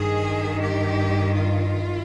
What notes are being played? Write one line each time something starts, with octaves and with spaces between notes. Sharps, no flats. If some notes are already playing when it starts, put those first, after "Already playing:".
Already playing: G2 D#3 G#4
G4
F4